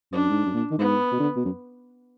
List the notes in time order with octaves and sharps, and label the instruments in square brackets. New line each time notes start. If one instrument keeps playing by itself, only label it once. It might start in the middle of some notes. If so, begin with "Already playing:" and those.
[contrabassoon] F#2 [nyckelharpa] D4
[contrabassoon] G#2
F#2
A#2
D#3
[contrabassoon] G#2 [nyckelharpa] B3
[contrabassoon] B2
D3
B2
F#2